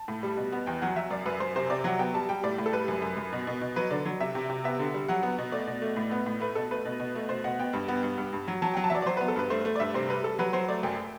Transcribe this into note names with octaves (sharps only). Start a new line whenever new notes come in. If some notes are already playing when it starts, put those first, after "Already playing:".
Already playing: A5
A2
G3
B2
B3
E2 G5
F#3 F#5
F#3 E5
F#2 D5
F#2 B4
F#2 C5
C3 C5
C3 D5
F#3 F#5
B3 G5
G3 A5
G3 G5
A2 D5
A2
A4
G3 B4
F#2
F#2
F#2
B2
B2
B2
F#3 B4
D3 D5
F#3
C3 E5
C3
C3
B3 E5
D3
G3
F#3 F#5
B3
B2
A3 D5
B2
A3
A2
B3
A2
A3 B4
B2 A4
A3 B4
B2
B2
A3
B2 C5
B2 F#5
B3 G5
G2
B3
G2
G2
G2
F#3
F#3 A5
G5
F#3
A5
F#3 D5 E5
D5
F#3 C5
B4
B3
A4
G2 B4
A3 C5
A3
D5
G2 E5
C3 C5
G3 B4
G3 A4
F#3 B4
F#3 C5
A3 D5
F#2 G5